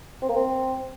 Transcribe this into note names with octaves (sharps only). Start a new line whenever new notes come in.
C4
A#3
C4